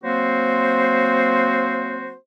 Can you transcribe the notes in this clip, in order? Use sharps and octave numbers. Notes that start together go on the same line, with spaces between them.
F#3 A#3 C4 F#4 C5